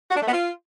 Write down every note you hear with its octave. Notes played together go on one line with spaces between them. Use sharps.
F#4
D4
A3
B3
F4